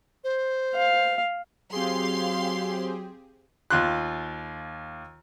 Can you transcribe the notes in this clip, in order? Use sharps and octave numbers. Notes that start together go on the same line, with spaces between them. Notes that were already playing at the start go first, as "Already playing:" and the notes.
C5
F5
F#3 C4 G4 G#4 F5 C6
D#2 F4 C6 F#6